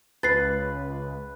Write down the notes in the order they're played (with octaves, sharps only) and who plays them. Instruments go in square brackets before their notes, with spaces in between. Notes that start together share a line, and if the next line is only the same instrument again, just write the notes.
[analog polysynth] C#2 [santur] B4 [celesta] A6 C7